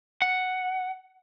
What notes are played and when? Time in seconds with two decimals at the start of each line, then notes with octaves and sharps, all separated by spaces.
0.22 F#5